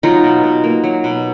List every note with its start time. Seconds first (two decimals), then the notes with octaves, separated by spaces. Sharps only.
0.03 F#3 D#4 F4
0.23 B2
0.43 B2
0.64 A#3
0.84 F#3
1.04 B2